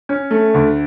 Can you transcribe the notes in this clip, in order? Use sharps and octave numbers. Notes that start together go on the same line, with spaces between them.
C#4
A3
D2